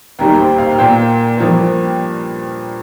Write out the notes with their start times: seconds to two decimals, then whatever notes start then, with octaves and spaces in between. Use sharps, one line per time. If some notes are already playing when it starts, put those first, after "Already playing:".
0.19 D#2 D#3 G3 A#3 A#4
0.39 C5
0.58 F5
0.72 F5
0.79 A#2 A#3 G5
1.37 G2 F3 A#3